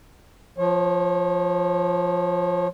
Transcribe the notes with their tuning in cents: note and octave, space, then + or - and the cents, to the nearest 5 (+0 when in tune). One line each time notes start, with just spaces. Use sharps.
F3 +0 C#5 -30